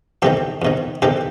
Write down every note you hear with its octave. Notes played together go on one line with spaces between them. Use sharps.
E2 C3 D#3 G4 A4
E2 C3 D#3
E2 C3 D#3 G4 A4